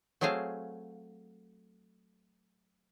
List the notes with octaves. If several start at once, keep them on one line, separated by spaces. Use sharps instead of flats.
F#3 A3 C4 G#4 F5